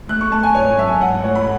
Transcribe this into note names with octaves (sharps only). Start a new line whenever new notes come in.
A3 F#6
C#6
A3 A5
G#5
G#2 C#5
F#3 E5
G#2 F#5
A3 C#5
B5